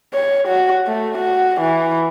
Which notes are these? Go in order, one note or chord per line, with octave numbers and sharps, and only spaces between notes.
C#5
F#4
A3
F#4
E3